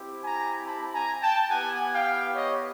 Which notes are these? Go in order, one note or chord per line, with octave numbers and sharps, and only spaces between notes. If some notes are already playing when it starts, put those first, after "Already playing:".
Already playing: C4 E4 G4
G#5 A#5
A5 B5
G#5 A#5
G5 A5
B3 E4 G4 F#5 G#5
F5 G5
C#5 D#5